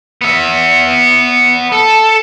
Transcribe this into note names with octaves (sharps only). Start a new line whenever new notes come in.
B3 E5
A4